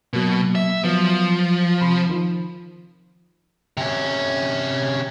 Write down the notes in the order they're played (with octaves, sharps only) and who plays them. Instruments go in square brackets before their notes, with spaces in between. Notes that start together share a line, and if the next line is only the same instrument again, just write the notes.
[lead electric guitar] B2 [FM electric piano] F#3 A#3
[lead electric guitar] E5
[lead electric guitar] F3 [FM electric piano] F#3 B3
[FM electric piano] C3 B5 C6
D#3 F3
[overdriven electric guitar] C3 C#4